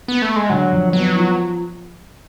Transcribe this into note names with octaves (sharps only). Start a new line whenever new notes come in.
B3
A3
G#3
D3 F#3
F2
F#3 B3
F3